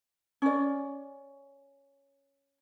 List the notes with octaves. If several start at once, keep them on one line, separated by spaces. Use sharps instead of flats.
C#4 D5